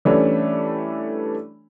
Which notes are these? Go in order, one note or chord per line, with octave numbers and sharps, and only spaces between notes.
E3 G3 A3 C#4 D4